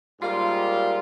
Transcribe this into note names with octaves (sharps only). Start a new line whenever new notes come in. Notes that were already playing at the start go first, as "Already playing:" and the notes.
G#2 G3 A#3 F4